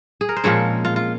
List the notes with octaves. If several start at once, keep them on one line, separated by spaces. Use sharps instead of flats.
G#4
A#4
C5
A#2 F3 G#3 C4 C#4 C#5
F4
F4